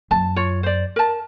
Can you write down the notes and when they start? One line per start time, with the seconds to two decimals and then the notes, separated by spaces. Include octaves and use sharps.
0.11 F#2 A5
0.36 F4 C#5
0.63 C5 D5
0.96 A#4 A5